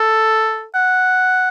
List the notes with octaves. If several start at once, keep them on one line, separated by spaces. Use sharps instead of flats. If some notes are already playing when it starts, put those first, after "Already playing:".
Already playing: A4
F#5